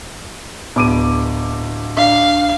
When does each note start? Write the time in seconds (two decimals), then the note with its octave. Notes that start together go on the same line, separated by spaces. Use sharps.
0.76 D1 B3 D6 D#7
1.97 D4 F5